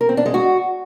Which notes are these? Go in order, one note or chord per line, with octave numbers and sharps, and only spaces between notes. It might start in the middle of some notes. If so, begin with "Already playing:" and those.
A#4
C4
D4
G#3
F#4